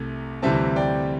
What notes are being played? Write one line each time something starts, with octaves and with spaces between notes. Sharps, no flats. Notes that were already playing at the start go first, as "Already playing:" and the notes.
Already playing: C2 C3 A3
D2 C3 E3 G3 C4 E5 A5
D5 G5